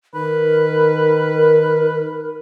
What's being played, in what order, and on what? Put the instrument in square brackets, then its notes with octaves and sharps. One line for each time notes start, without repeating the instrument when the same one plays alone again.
[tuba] D#3 [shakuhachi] A#4 [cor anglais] B4